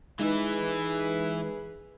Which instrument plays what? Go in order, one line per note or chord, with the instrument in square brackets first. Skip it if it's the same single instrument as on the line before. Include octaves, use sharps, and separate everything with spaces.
[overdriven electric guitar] E3 E4 [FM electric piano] G#3 D#4 [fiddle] G#4 B4